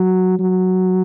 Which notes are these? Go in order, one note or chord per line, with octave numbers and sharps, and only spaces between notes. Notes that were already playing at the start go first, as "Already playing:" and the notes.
Already playing: F#3
F#3